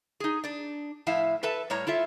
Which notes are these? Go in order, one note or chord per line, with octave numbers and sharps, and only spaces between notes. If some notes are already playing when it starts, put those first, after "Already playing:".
D#4 G#4
D4 D5
A2 F3 E4 E5 F5
A4 B4 E5 A5
A2 G3 C#5 A#5
E4 F4 A4 E5